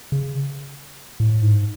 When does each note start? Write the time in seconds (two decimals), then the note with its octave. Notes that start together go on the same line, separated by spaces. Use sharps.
0.12 C#3
1.20 A2
1.42 G#2